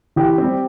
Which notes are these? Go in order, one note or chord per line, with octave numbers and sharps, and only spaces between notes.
E3 G4
G3 C4